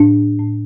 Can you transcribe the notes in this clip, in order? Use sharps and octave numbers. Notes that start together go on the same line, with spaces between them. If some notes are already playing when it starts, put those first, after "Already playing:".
Already playing: A2 D4
A2